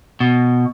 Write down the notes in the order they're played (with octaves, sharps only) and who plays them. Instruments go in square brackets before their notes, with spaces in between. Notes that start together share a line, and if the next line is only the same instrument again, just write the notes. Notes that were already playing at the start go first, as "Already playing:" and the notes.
[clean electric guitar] B2